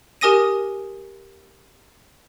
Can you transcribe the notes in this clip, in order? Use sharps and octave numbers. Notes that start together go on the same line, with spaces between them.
G4 A#4 G#5 D#6 A#6 D#7